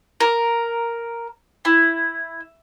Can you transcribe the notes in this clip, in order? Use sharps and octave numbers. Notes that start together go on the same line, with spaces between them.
A#4
E4